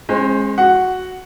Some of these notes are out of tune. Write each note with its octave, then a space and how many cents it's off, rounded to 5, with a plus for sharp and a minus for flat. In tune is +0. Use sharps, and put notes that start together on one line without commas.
G#3 +0 C#4 -45 C5 +0
F#4 +0 F#5 +0